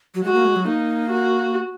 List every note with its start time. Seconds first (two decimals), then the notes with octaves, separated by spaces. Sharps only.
0.15 F#3
0.23 G#3 F#4
0.34 A#3
0.45 G#3
0.56 F#3
0.66 A#3 D#4
1.10 F#4